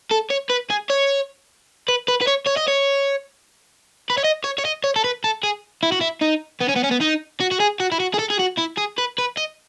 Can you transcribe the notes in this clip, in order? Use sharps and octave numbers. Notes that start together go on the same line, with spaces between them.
A4
C#5
B4
G#4
C#5
B4
B4
B4
C#5
C#5
D#5
C#5
B4
C#5
D#5
C#5
C#5
D#5
C#5
A4
B4
A4
G#4
E4
F#4
E4
D#4
B3
C#4
B3
C#4
B3
D#4
F#4
F#4
G#4
F#4
E4
F#4
G#4
A4
G#4
F#4
E4
G#4
B4
B4
D#5